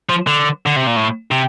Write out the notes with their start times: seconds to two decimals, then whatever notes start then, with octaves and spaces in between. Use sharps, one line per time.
0.10 F3
0.27 D3
0.66 D3
0.76 C3
0.87 A#2
0.96 A2
1.31 C3